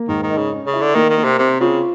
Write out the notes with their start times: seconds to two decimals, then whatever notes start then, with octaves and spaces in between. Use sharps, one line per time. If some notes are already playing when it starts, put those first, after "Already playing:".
Already playing: A#3
0.08 G#2 D#3
0.23 D#3
0.30 D#4
0.37 C#3
0.52 C#4
0.66 C#3
0.73 E4
0.81 D3
0.95 D#3 A#3
1.10 D#3
1.17 A#3
1.24 C3
1.38 C3 C4
1.60 C#3 F4